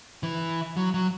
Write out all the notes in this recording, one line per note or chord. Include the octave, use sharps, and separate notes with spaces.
E3
F#3
F#3